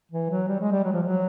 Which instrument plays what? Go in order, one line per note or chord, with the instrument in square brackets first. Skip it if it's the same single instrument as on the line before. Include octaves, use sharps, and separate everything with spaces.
[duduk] E3
F#3
G3
G#3
G3
F#3
F3
F#3